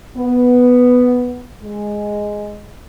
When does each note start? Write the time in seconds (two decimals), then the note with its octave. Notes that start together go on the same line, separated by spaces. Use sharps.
0.17 B3
1.63 G#3